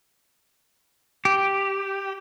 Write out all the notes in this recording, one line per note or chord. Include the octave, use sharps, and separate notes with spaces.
G4